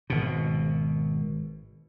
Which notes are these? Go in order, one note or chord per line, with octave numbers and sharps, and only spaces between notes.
G#1 B2